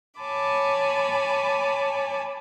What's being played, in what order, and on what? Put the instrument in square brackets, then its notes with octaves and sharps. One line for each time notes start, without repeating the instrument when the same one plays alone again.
[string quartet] C#5 G#5 A5 B5 D6